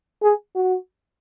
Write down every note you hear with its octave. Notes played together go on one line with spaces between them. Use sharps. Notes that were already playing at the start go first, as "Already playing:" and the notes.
G#4
F#4